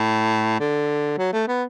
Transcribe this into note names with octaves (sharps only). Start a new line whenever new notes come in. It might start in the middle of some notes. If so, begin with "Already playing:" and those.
Already playing: A2
D3
F#3
A3
B3